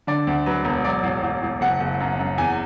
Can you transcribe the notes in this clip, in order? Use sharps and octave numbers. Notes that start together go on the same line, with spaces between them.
D3 D5
D2
F#3 B4
E1
F#3 D5
A1
A1
A1
F#1 F#5
F#1
F#2
F#2
E2 G#5